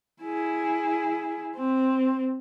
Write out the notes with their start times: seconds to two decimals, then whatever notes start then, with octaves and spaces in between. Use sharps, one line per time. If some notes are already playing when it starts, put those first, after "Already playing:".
0.23 E4 G#4
1.56 C4